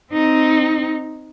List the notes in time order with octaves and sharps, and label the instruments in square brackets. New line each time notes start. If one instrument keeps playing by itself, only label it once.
[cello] C4 D#4